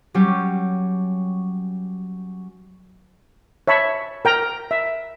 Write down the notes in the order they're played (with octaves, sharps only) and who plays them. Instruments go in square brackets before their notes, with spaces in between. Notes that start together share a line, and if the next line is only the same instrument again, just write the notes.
[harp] F#3 G3 C#4 G4
[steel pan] C#5 E5 A5 B5 C#6
A#4 G5 A#5
E5